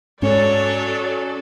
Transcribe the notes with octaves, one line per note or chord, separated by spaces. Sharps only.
G#2 F#3 C#4 A4 C#5 D5